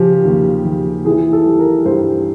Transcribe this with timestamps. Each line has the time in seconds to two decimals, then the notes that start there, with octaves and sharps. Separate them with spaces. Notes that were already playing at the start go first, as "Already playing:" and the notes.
Already playing: C#3 F3 G4
0.25 D#2
0.65 D#2
1.05 E3 G#4
1.33 A4
1.46 G3
1.59 A#4
1.85 G2 C5